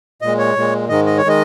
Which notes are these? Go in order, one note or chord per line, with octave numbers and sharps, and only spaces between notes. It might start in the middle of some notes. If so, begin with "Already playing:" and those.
A#2 G#3 D#5
C#5
A#2 G#3
G#2 D#3 G#3 D#5
D#5
C#5
D#3 G#3 D#5